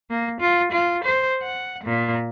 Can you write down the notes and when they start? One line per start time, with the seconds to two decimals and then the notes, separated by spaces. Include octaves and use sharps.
0.10 A#3
0.40 F4
0.72 F4
1.04 C5
1.43 F#5
1.84 A#2